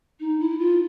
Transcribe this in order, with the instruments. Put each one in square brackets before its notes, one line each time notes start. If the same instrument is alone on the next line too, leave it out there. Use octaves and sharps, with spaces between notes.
[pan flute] D#4
E4
F4